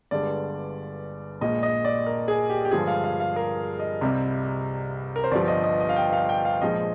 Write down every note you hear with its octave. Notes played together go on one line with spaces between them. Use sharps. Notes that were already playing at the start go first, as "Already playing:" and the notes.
G1 G2 D3 G#3 D5
A#1 A#2 G#3 D#5
D#5
D5
A#4
G#4
G4
G4
G2 D3 F3 G#3 G#4
F5
F5
F5
A#4
D#5
C2 C3 G3
A#4
C5
G1 G2 F3 D5
D#5
D#5
D#5
F5
G5
F5
G5
F5
A#1 A#2 F3 G#3 D#5